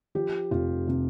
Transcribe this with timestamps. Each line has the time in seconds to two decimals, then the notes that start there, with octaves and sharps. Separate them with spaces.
0.15 F3 G4
0.51 F1 F4
0.87 C3